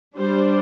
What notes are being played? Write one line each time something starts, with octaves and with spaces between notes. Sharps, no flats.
G3 D4 C5